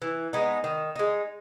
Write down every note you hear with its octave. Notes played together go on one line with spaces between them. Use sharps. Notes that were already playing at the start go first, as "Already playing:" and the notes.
E3
G#3 B3 D#4
D#3
G#3 D#4